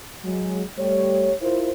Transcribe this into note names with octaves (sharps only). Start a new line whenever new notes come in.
F#3 G#3
G3 A3 G4 C#5
E4 F4 A#4 C5